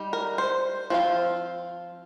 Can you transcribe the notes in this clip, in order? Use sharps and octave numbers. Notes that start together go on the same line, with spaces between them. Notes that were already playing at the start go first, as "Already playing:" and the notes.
Already playing: G3 D#4
A#4
C5
F3 C4 F4